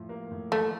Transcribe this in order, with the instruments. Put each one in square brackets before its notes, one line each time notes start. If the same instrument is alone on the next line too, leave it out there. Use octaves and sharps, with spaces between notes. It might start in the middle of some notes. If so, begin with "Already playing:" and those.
Already playing: [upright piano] A2 F3
A#3
A2
[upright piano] F3 [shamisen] A3